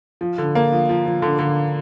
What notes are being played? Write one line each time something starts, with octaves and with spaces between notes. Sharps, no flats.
F3
D3
A#3
F3
F3
F3
D3
D3